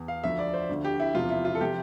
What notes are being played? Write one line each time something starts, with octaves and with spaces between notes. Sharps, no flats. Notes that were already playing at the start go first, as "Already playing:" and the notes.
Already playing: E2
F5
D2 D3 F3 E5
D5
C5
D2 D3 F3
G4
E4
E1 E2 C3 F3 F4
E4
F4
A4
C3 F3 G4